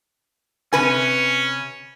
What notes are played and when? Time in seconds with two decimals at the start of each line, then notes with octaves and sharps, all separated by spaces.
0.73 C3 C#4 B4 G#5